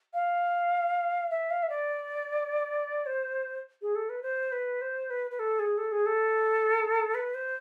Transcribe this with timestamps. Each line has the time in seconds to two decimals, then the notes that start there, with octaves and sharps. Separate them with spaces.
0.14 F5
1.30 E5
1.50 F5
1.62 E5
1.69 D5
3.06 C5
3.82 G#4
3.95 A4
4.09 B4
4.22 C5
4.52 B4
4.81 C5
5.10 B4
5.31 B4
5.39 A4
5.59 G#4
5.77 A4
5.92 G#4
6.06 A4
7.14 B4
7.34 C5